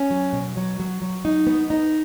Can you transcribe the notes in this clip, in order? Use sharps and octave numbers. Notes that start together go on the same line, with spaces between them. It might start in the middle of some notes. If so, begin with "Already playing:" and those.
Already playing: C#4
F#3
B2
F#3
F#3
F#3
D#4
B3
D#4